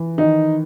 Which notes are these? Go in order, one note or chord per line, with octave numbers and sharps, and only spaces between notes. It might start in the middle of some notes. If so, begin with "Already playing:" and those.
Already playing: E3
D#3 D#4